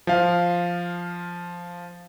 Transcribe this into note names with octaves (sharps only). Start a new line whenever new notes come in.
F3 F5